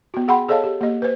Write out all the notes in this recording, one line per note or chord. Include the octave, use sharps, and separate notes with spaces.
B3 F#4
G#4 F#5 G5 B5 C6
G#4 A4 C#5 D#5 F5 A5
G4
A#3 G4 D#5
B4 C5